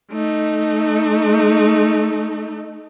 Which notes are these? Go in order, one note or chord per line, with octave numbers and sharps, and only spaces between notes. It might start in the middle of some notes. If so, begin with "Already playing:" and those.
A3 D#4